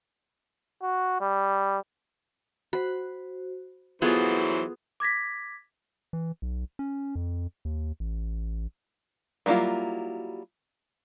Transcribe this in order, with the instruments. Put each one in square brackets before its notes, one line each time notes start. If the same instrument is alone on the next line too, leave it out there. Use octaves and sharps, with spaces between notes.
[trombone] F#4
G3
[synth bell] F#4 C5 [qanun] B5
[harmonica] E3 F#3 C5 [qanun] B3 F4 G#4 [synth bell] A4
[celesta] D6 G#6 A#6 B6
[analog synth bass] E3
B1
C#4
F2
D#2
A1
[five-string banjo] F#3 G3 A#3 E4 F4